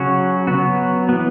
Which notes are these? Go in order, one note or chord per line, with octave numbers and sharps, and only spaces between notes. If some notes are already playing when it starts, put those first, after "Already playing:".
Already playing: C#3 F#3 C#4 F#4
F#3 B3 F#4
E3 B3